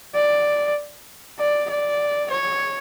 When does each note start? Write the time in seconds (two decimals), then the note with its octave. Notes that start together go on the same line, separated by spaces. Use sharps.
0.15 D5
1.39 D5
1.70 D5
2.31 C#5